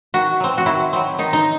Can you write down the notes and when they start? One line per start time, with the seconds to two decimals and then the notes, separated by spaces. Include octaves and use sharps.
0.14 D#3 F#4
0.40 F#3 C4
0.58 F#4
0.66 D#3 E4
0.93 F#3 C4
1.19 D#3 D#4
1.33 D#4